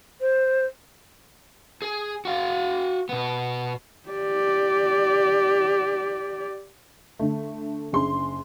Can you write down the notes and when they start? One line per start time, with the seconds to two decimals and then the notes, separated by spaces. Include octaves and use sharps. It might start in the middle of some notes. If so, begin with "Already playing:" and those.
0.21 C5
1.82 G#4
2.25 F#4 F5
3.09 B2 B3
4.09 G4 D5
7.19 D3 A3
7.92 F#1 D4 G#4 C6